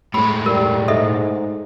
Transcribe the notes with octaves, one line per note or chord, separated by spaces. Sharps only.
A2 G#3 B5
G3 A#4
G#2 A4 D#5 E5